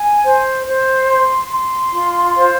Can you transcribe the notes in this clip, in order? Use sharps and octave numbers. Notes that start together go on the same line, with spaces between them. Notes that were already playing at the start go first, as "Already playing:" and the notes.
Already playing: G#5
C5
C5
C6
C6
F4
C5